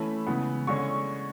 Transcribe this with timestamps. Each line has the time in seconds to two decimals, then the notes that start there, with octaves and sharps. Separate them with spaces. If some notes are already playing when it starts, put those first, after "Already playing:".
Already playing: E3 A3 C#4 B5
0.27 C#3 E3 G#3 B3
0.67 D3 G#3 C#4 C#6